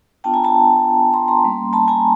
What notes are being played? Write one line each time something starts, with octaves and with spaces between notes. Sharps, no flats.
B3 D4 F4 G5 A5
G#5 A#5
A5 B5
A#5 C6
A#5 C6
G3 A#3 C#4
A5 B5
G#5 A#5